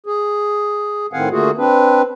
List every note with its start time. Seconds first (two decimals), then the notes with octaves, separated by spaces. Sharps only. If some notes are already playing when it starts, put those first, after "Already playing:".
0.06 G#4
1.13 A2 D#3 C4 F5 F#5 G#5
1.31 D3 A3 A#3 F4 F#4 G#4
1.58 C4 D4 B4